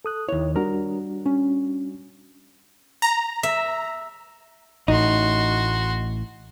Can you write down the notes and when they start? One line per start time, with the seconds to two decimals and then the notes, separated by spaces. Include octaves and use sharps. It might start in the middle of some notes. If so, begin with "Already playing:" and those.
0.05 A4 D#6 F#6
0.29 D#2 E4 C#5
0.56 G3 D4 F#4 A#4 A#5
1.26 C#4
3.02 A#5
3.43 E5
4.88 A1 A2 D#4 F#4 C6